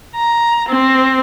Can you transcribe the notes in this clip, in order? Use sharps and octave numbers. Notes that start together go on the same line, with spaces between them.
A#5
C4